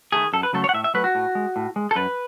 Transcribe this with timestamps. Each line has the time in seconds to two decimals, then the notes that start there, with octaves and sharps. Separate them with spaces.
0.12 D#3 A3 G#4
0.33 F#2 A4
0.43 B4
0.53 C#3 F#3 A3 A4
0.64 C#5
0.69 F#5
0.74 A2 E5
0.84 E5
0.94 F#3 A3 B4
1.04 F#4
1.15 A2
1.35 G#3
1.56 A2
1.76 G#3
1.91 A4
1.96 F#2 B4